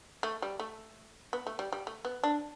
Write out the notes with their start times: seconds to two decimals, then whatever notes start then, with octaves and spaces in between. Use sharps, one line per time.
0.23 A3
0.42 G3
0.59 A3
1.33 B3
1.47 A3
1.59 G3
1.72 G3
1.87 A3
2.05 B3
2.23 D4